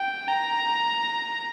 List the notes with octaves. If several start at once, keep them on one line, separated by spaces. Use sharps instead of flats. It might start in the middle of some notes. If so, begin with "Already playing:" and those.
Already playing: G5
A#5